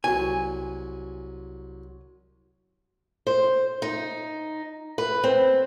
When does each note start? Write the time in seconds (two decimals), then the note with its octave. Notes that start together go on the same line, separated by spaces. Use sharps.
0.04 C2 F#3 G#5 C6
3.27 C5
3.82 D#4
4.98 B4
5.24 C4